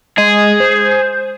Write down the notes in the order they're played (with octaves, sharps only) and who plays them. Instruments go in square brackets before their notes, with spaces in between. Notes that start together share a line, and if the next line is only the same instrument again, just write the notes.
[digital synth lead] G#3 [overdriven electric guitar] G#4
[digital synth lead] C5